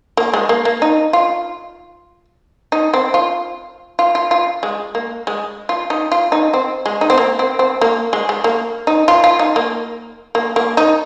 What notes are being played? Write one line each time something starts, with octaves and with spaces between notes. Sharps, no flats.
A#3
G#3
A#3
A#3
D#4
F4
D#4
C4
F4
F4
F4
F4
G#3
A#3
G#3
F4
D#4
F4
D#4
C4
G#3
D#4
C4
A#3
C4
C4
A#3
G#3
G#3
A#3
D#4
F4
F4
D#4
A#3
A#3
A#3
D#4